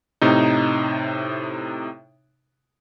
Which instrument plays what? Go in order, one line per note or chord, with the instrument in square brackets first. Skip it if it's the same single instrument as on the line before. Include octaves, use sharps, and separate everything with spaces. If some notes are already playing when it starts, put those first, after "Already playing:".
[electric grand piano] A2 C3 D#4